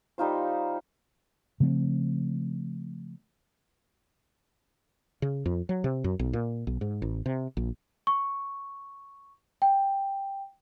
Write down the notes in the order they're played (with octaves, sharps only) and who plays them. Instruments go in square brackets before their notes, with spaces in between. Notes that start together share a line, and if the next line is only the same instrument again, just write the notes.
[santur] G3 D#4 F4 C5
[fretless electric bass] C#3 F3 A3 C4
C#3
F2
F#3
C3
F#2
B1
A#2
B1
G#2
A1
C3
A#1
[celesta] C#6
G5